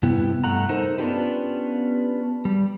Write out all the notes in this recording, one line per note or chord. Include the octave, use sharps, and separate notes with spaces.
G2 C3 B3 E4 G4
G2 A3 F#5 A#5
D#4 A4 A#4 C5
B3 C#4 D4 F4 G4 B4
G3